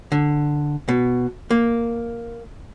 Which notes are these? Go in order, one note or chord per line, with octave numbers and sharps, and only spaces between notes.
D3
B2
A#3